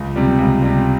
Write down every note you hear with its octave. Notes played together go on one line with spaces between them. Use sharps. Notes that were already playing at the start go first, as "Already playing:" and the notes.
Already playing: C#2
C3 G3
C#2
C3 G3